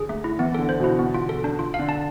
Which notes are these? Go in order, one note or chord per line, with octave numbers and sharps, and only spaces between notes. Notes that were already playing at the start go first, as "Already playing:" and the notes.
Already playing: D3 G#4
A3
E4
E3 B3
D3 A4
C5
B2 E4
B3
F4
A4
D4
F4
F5
D3
A5